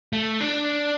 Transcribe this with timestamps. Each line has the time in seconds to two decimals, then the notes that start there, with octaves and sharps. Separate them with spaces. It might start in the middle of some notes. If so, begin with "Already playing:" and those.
0.13 A3
0.40 D4